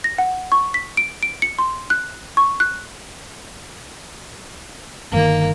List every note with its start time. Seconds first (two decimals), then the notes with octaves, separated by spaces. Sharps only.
0.04 A#6
0.18 F#5
0.52 C#6
0.74 B6
0.97 D7
1.23 D7
1.42 C#7
1.59 C6
1.90 F#6
2.37 C#6
2.60 F#6
5.12 G1 A#2 D#3 A#3